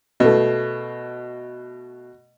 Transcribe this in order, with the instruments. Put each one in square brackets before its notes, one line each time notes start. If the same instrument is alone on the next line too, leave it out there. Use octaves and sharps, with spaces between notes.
[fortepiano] B2 A3